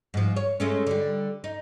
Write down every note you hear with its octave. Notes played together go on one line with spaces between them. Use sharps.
G#2 F3
C#5
G#3 A3 C#4
D3 G3
D#4